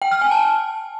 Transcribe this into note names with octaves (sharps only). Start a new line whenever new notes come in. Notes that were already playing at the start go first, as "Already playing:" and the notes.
G5
F6
G#5
A5